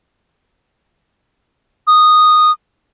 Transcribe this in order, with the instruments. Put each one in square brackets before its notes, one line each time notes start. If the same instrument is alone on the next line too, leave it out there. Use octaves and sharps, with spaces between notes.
[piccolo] D#6